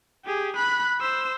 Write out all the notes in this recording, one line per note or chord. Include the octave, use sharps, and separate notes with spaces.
G4 G#4
B5 F#6
C5 E6